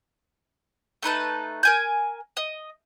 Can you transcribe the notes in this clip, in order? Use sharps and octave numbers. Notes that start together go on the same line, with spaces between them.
A3 D#4 B4 A5
A#4 G#5 G6
D#5